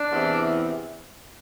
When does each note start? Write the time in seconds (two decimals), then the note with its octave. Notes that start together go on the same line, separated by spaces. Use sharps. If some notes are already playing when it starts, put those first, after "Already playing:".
Already playing: D4
0.12 E2 C3 E3